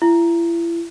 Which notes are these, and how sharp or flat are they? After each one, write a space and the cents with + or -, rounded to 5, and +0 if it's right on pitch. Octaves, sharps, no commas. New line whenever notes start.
E4 +35